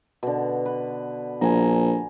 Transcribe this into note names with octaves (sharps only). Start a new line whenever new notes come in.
B2 D3
B4
A#1 G#5 A#5